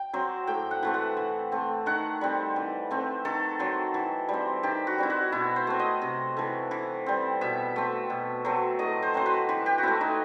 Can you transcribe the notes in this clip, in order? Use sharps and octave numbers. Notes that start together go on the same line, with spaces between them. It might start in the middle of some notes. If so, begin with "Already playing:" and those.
Already playing: G5
F#3 C4
A2 G5
F#5
E3 A3 C4
F#5
E3
A3 C4
D#3 F#5
G3 C4
E3
A3 C4
D#3 A4
F#3 C4
E3
G3 C4
D#3 G4
F#4
G3 C4 E4
F#4
B2 E4
C5
A3 C4
D#5
C3
E3 A3
E3
G3 C4
B2 E5
A3 C4
B2
F#3 A3 C4
A2 D#5
C5
F#3 C4 C5
B4
E3 G4
G4
F#4
A3 C4 E4
D#4